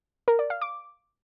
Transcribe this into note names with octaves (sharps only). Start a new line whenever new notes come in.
A#4
D5
F5
D6